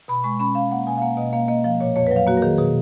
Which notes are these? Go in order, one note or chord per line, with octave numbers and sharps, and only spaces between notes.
B2 B5
G#3 C#6
C#4 B5
C#4 F5
A#3 F#5
B2 G#5
F5
A#3 F#5
B2 D#5
A#3 F5
A#3 D#5
F3 F5
A#2 C#5
F2 C#5
B4
F#3 F5
A#3 F#4
A#4
D#3 G#4
B2 G#4